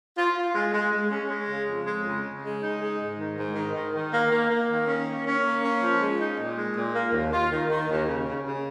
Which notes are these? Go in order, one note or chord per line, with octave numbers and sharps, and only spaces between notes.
F4
F4
G#3
G#3
G#3
C#4
G#3
C#3
F2
G#3
C#3
C#3
G#3
D#4
G#3
G#2
D#3
G#2
D#3
D#3
D#3
A#3
A#3
A#3
D#3
C#4
A#3
C#4
A#3
C#4
F3
G#3
D#4
A#2
G#3
A#2
A#3
D#2
F4
D#3
D#3
D#2
C#3
C#3
C#3